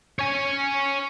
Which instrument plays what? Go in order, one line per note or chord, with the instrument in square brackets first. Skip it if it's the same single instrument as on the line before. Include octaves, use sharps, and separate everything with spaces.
[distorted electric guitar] C#5 G#5